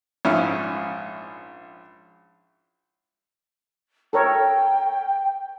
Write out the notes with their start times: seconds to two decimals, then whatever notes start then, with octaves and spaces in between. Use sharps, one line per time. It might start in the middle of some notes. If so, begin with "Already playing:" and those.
0.25 A#1 G#2 C#4 E4 F6
4.13 A4 A#4 C#5 G5